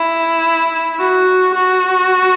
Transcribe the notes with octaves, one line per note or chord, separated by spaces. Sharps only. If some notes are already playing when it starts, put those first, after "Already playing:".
Already playing: E4
F#4
F#4